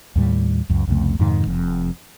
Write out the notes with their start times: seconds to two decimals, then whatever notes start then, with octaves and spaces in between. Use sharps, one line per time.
0.16 D#2 A2 G3
0.69 C#2 F#2
0.87 C2 F2 C#3 A3
1.19 F2 G#2 C3 D#3
1.47 F1 F2